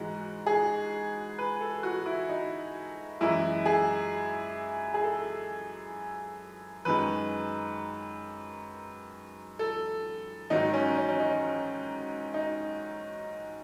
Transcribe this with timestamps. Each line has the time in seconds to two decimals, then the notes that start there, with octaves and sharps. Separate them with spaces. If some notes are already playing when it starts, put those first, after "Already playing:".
Already playing: G#2 E3 G#3 F#4
0.46 G#4
1.39 B4
1.61 A4
1.83 F#4
2.06 E4
2.29 D#4
3.21 F#2 E3 G#3 E4
3.66 G#4
4.94 G#4
5.03 A4
6.85 F#2 D#3 G#3 B4
9.59 A4
10.50 G#2 D#3 F#3 D#4
10.73 C#4
10.97 C#4
11.09 C#4
11.20 D#4
12.34 D#4